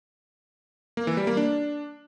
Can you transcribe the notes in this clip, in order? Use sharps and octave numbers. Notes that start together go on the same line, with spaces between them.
A#3
E3
G3
A#3
D4